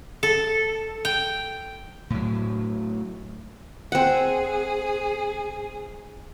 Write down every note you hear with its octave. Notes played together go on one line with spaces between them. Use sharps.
A4
G5
A2 F#3
C4 G#4 F#5